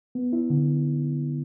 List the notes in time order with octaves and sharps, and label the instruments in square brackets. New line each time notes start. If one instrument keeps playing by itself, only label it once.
[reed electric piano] B3
E4
D3